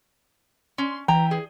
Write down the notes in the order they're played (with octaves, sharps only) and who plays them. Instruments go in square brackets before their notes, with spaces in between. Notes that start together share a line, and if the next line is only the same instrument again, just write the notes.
[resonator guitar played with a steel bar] C#4 [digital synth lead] C6
[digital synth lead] E3 [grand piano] G5 [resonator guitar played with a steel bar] A#5
[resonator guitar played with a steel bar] G#4